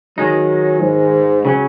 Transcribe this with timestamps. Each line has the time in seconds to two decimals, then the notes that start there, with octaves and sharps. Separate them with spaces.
0.18 D#3 F#3 G#3 D#4
0.81 G#2
1.45 C#3 F#3 C#4